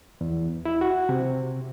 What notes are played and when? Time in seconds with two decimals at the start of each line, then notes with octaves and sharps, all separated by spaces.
0.21 E2
0.65 E4
0.81 F#4
1.09 C3